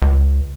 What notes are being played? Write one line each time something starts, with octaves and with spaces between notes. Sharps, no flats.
C#2